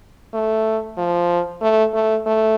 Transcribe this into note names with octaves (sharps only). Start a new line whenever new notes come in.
A3
F3
A3
A3
A3